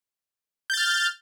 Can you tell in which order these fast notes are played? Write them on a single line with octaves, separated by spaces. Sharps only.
G6 A6 F6